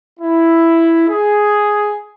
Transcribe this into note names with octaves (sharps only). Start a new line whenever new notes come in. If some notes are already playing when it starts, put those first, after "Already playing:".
E4
G#4